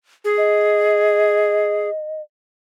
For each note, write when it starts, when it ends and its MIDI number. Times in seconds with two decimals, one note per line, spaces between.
0.25 1.90 68
0.37 2.22 75